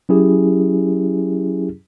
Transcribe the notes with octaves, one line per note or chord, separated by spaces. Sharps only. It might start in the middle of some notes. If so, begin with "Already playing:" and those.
F#3 C#4 E4 G4 G#4